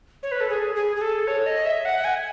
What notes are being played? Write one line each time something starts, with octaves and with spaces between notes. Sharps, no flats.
C#5
B4
A4
G#4
G#4
G#4
A4
C#5
D#5
E5
F#5
G#5